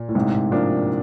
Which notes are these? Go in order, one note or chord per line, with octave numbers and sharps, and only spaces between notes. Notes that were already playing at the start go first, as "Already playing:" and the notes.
Already playing: A#2
A2
G#2 C3
F3 A#3 D4